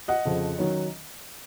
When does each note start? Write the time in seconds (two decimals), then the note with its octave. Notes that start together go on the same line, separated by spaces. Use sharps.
0.08 D#5 F#5
0.25 F2 C#3 F3
0.58 D#3 F#3 C#4